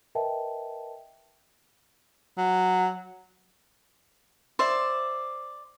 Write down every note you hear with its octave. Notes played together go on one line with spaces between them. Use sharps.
A#4 B4 D#5 E5 G5 A5
F#3
C5 D5 E5